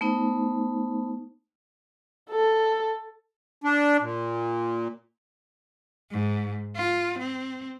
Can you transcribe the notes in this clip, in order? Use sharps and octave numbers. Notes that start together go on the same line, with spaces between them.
A3 B3 D#4 C5
A4
D4
A#2
G#2
F4
C4